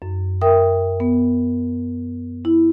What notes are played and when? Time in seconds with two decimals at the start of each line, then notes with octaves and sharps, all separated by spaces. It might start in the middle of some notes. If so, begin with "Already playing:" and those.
0.02 F#2
0.41 A#4 E5 G5 D#6
1.00 B3
2.45 E4